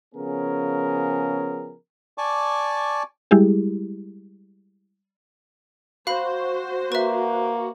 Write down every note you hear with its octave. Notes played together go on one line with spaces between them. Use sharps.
C#3 F3 B3 C#4 G#4 A#4
D5 G#5 A5 C#6 D6
G3 G#3 E4 G4 G#4
F#4 C5 F5 B5
A#3 B4 E5